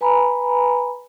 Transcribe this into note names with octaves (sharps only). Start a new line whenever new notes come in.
B4 G#5 A#5 B5